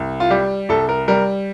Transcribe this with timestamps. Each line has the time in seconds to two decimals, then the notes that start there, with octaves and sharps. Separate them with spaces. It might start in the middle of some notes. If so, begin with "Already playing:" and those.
Already playing: C2
0.20 F4
0.30 G3 G4
0.69 C2 A4
0.89 A#4
1.08 G3 A#4